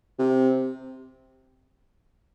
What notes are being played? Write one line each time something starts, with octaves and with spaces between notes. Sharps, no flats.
C3